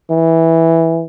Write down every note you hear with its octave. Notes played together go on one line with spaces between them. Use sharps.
E3